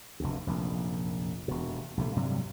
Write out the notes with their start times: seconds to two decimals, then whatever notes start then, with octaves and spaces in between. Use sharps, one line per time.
0.20 F1 D2
0.47 F1 A#1 F#2
1.48 E1 B2
1.97 A#1 C3 A3
2.16 G2 C3 F#3 G3